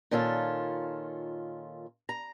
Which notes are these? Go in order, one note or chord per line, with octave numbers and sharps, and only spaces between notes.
A#2 D#3 C#4 F4 A4
A#5